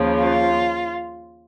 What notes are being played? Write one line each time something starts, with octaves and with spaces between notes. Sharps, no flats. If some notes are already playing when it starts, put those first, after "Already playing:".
Already playing: D#2 C#3 F3
F4